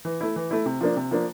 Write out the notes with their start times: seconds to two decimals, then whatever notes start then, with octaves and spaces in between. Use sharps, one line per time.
0.05 E3
0.21 A3 E4
0.36 E3
0.51 A3 E4
0.66 C3
0.81 F3 A#3 D4
0.96 C3
1.11 F3 A#3 D4